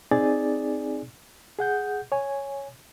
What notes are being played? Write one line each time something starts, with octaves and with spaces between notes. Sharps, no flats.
C4 D#4 G#4 D5 G#5 A6
G#4 F#5 G6
C#5 G#5